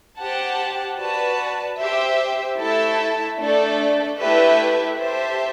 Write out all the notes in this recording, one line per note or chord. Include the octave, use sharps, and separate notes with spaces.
G4 C5 F#5 A5
F#4 B4 D5 A5
G4 C5 E5
A3 E4 A4 E5 A5
A3 D4 A4 D5
A3 E4 G4 B4 E5
G4 C5 E5 A5